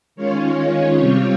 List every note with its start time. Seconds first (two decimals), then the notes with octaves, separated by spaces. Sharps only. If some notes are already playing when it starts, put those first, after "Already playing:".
0.16 D#3 G#3 C#4 F4 C#5
0.96 C3 G3 C4 F4